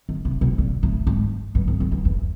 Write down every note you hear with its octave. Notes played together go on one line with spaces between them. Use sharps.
D#3
C3
B2
A#2
A2
G#2
G2
F2
F2
E2
E2